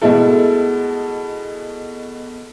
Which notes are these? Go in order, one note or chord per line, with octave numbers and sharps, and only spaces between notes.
B2 G#3 A3 E4 A4